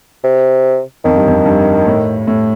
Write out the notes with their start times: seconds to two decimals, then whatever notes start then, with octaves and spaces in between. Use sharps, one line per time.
0.24 C3
1.05 F2 D#3
1.16 G2
1.28 F2
1.46 G2
1.87 A2
2.27 A2